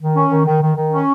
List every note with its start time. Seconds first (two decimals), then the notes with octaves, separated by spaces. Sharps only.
0.01 D#3
0.15 C#4
0.31 D#3
0.46 D#3
0.61 D#3
0.77 D#3
0.92 C#4